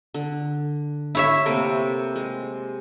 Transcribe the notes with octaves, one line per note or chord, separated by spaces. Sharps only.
D3
E4 C#5 E5
C3 A3 A#3
G#3